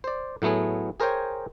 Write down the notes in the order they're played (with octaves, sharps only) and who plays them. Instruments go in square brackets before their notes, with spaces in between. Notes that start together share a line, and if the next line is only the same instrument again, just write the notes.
[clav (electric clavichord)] C5 D5
A2 F#3 A3 B3 G#4
G#4 A#4 C5 C#5 G5 G#5